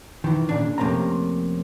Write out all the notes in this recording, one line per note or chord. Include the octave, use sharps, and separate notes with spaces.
D#3 E3
A#2 C#3 D4
F2 C3 A3 A#3 C#4 A#5